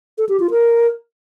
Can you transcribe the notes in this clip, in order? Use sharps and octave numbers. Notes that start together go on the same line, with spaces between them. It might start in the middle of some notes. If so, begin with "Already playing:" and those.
A4
G4
F4
A#4